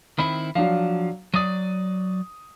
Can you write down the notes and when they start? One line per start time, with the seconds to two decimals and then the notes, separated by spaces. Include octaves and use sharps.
0.18 D#3 C4 E4 B5
0.55 F3 F#3 D4 F5
1.34 F#3 D5 D#6 D#7